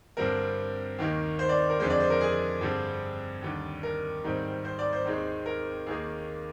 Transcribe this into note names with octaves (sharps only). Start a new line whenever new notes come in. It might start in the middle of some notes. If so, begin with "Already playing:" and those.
G2 D3 G3 C4 A#4
D#2 D#3 A#3
C5
D5
A#4
F2 D3 G#3 C5
D5
C5
A#4
G#4
G2 D3 G3 C4
D#2 D3 G3
A#4
G#2 D#3 G3 C4
C5
D5
C5
D#2 D#3 G#3 C4
A#4
D#2 D#3 A#3 G#4